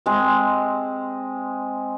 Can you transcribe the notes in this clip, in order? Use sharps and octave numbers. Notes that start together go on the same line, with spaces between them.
G#3 C4